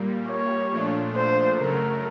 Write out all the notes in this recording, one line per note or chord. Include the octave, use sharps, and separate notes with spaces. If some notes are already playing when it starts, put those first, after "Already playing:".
Already playing: A#2 G3 A#3
C#5
A#2 F3 A3 D4 F4
C5
F#2 C#3 F#3 A3 A#4